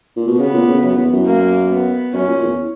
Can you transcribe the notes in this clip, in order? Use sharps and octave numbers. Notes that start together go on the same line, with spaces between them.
A#2
B2
C#3 B3
A#2
C#3
F#2
E2
F#2
A#3
B3
F#2 C#4
A#2
E2